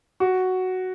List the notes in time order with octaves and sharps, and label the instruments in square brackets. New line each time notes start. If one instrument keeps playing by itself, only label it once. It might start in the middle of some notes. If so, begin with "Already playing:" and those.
[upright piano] F#4